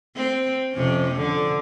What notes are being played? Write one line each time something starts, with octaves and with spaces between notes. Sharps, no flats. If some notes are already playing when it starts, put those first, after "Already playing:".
C4
F2 C3 C#4
D3